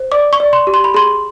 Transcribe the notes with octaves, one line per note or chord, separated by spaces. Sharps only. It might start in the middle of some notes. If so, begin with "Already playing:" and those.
Already playing: C5
D5 D6
C#6
D5
C6
G4
C6
B5
G#4 C6